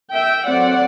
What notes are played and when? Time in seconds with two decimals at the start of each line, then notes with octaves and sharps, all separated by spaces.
0.12 E5 G5
0.46 F#3 A3 C4 D5 F#5